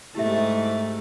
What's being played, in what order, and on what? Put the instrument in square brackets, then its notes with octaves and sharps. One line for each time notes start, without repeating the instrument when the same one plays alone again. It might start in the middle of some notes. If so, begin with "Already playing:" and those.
[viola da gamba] G#2 A3 [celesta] E4 G4 E5